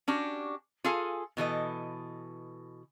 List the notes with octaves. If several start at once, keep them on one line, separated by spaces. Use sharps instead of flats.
C#4 D4 F#4 G4
F4 G#4 A4 F5 G#5
B2 E3 A4 D#5